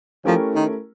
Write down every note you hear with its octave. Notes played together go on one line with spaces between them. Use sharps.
F3 A3 C#4 E4 G4 A#4
D#3